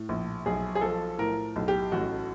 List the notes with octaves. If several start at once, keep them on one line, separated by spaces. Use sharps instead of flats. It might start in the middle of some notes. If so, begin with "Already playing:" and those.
Already playing: A2
A#1
B1 G#4
G#4
F3 A4
A2 A#4
B1
G4
A1 F#4